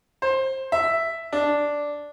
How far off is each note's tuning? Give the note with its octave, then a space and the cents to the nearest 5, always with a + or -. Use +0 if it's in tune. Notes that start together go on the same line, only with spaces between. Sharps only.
C5 +20
E5 +5
D4 -5